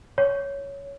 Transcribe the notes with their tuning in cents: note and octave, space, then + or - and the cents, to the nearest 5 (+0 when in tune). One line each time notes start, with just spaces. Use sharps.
C#5 +5